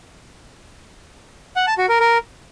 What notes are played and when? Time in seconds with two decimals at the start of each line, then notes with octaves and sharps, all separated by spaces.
1.56 F#5
1.67 A5
1.78 F#4
1.89 A#4
2.00 A#4